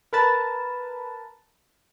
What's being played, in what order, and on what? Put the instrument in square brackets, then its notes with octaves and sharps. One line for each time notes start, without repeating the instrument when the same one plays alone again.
[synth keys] A#4 B4 A5